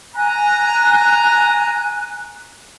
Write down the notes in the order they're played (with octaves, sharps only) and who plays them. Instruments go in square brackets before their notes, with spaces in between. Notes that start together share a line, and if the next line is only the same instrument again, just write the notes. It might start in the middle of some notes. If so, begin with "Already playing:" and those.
[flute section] G#5 F#6 [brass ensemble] A#5